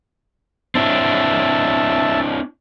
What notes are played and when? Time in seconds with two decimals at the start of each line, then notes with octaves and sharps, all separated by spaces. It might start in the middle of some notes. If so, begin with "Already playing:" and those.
0.75 C4 D4 E4 E5 A5